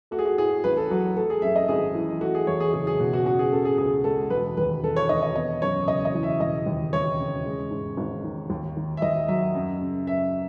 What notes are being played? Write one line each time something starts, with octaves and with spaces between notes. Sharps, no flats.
A3 F#4
G#4
F#4
A2 G#4
A1 B4
A4
F#3 F#4
A3 A4
G#4
F#2 E5
D#5
G#1 G#4
E3
A3 F#4
G#4
E2 C#5
G#4
F#1 G#4
G#4
B2 F#4
F#4
C#4 F#4
G#4
C#3 A4
G#4
C#2 G#4
G#3 A4
E1 B4
D#2 B4
E1 A4
C#5
D#3 D#5
D#5
B3 D#5
F#2 C#5
F#1 D#5
D#5
E3
E5
E1 D#5
D#2
E1 C#5
C#3
G#3
G#2
G#1
D#3
D#2
D#3
E5
D#2 D#5
F#3 E5
F#2
C#3
F#2 E5